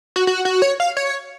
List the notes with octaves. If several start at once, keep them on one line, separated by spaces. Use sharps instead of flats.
F#4
F#4
F#4
C#5
F5
C#5